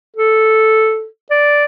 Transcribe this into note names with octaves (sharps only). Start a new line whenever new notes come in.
A4
D5